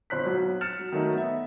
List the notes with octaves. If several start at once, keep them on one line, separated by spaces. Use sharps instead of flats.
G1 C5 F#6 B6
B1 F#3
F6 A6 C#7 E7
F#3
D#3 F#3 A3 D#4
B3 E5